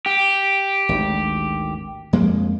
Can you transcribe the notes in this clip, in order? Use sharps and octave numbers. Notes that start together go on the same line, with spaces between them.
G4
G#1 D2
F2 G#3 A#3